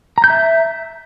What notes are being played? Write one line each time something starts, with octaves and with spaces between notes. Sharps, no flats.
A#5
G6
E5